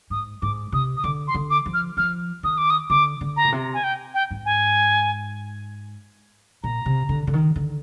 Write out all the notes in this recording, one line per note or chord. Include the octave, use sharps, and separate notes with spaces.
G#2 D#6
G#2 D6
C3 D#6
D#6
D3 D6
C6
D3
D6
F3
F6
F3 F6
D#3 D#6
D6
D#6
D3 D6
D3
A#5
A#2
C3
G#5
G5
G5
G#2
G#5
A#2 A#5
C3
D3
D3
D#3
D3